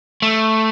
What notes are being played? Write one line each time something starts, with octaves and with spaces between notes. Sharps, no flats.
A3